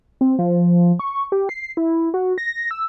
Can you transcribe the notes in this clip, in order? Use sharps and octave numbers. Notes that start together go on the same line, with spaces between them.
C4
F3
C#6
G4
C7
E4
F#4
A#6
E6